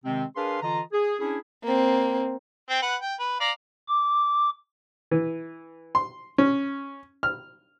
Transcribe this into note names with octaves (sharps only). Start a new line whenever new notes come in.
C3 D#3 G#3 C4
D4 G#4 A#4 B4 F5 C6
D3 E3 F4 D#5 A#5
G#4
C#4 D4 E4 G#4
A#3 C4
C4 G5
B4 F#5
G5
B4
D5 F5 A#5
D6
E3
C6
C#4
F6